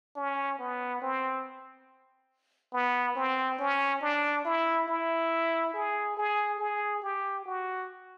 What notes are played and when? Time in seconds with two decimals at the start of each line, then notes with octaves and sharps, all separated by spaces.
0.16 C#4
0.59 B3
1.02 C4
2.73 B3
3.15 C4
3.59 C#4
4.01 D4
4.45 E4
4.88 E4
5.74 G#4
6.17 G#4
6.59 G#4
7.02 G4
7.46 F#4